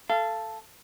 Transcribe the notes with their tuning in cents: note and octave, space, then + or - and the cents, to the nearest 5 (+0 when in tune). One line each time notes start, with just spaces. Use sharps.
A4 +0 F5 -30